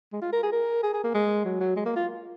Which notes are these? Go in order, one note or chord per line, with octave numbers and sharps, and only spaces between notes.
G#3
F4
A#4
G#4
A#4
G#4
G#4
A#3
G#3
F#3
F#3
G#3
A#3
F4